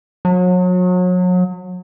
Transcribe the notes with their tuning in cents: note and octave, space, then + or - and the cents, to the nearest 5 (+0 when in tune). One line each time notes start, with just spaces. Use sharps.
F#3 -35